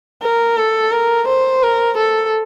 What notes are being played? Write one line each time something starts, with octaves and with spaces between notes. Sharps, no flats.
A#4
A4
A#4
C5
A#4
A4